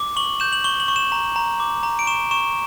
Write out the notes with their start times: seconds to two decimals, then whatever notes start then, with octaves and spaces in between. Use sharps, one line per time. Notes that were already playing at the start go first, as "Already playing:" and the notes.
Already playing: D6
0.16 C#6 F#7
0.40 G6 E7
0.52 F#7
0.64 C#6 G7
0.80 F#7
0.88 C#6
0.96 E7
1.12 A#5
1.36 A#5
1.60 D6
1.83 A#5
1.99 D7
2.07 C#6 E7
2.31 C#6 E7